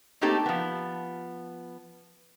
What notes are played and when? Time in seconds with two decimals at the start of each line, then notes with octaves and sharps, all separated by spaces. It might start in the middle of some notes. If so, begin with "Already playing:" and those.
0.21 A3 A#3 C4 D#4 G4 A4
0.46 F3 B3